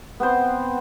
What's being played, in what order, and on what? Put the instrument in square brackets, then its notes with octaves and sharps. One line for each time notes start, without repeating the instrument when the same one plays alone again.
[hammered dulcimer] B3 C4 C5